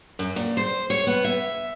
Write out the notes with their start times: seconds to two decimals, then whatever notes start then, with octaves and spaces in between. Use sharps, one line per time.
0.19 F#2
0.36 A#2
0.57 C5
0.90 C#5
1.07 B3
1.24 E5